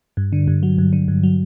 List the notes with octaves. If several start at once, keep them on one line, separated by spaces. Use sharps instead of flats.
G2
D3
G2
F#3
G2
D3
G2
F#3